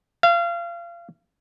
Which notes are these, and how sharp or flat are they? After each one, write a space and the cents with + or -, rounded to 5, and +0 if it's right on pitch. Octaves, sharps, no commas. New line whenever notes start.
F5 -30